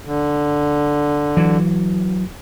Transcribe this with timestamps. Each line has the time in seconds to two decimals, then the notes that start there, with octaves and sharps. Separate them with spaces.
0.05 D3
1.37 E3 F#3